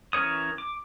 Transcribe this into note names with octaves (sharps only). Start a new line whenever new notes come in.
E3 C#4 A#4 C#5 D#6
D6